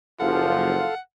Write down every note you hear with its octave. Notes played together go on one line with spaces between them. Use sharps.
F#1 F3 F4 A4 F5 F#5